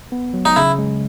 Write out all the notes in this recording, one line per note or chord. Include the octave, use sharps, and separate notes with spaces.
B3
F#3
D#4
C#3 E4
G#3